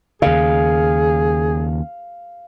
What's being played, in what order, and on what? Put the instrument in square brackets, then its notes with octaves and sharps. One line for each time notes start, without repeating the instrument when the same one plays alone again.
[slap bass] D#2 C#3 [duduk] G#4 [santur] F5